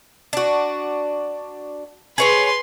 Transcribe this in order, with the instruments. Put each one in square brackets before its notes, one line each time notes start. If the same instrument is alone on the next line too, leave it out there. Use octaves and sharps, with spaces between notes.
[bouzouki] D4 F#4
[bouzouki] G#4 C#5 A#5 [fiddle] B4 C6